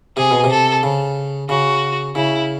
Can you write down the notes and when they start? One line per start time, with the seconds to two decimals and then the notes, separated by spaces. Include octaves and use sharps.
0.17 C3 G#4
0.31 B2
0.44 C3
0.51 A4
0.83 C#3
1.49 C#3 F#4
2.15 C#3 E4